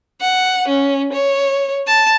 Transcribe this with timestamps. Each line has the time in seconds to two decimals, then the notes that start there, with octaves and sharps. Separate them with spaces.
0.21 F#5
0.68 C#4
1.13 C#5
1.87 A5